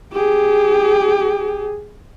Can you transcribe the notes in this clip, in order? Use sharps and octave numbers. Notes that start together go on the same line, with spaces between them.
G4 G#4